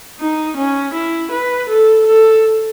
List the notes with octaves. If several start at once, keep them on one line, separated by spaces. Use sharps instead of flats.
D#4
C#4
E4
B4
A4
A4